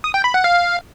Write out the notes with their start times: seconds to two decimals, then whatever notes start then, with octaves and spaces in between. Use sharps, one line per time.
0.04 D#6
0.14 G5
0.24 B5
0.34 F#5
0.44 F5